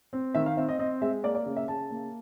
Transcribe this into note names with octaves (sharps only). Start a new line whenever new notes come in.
C4
D#3 E5
F5
C4 E5
D#5
C4 D#5
G#3 E5
A#3 D5
D5
C#3
E5
C#3 A5
A#3